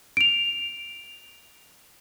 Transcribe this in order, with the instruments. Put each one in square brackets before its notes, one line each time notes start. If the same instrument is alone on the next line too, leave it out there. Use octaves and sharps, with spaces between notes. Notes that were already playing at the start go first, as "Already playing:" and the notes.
[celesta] D7 F7